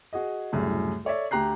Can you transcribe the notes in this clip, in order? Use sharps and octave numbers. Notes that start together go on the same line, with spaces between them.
F#4 G#4 D#5
C2 F#2 A2 C#3
A4 C#5 D5 E5
D2 G4 A#5 F#6 C7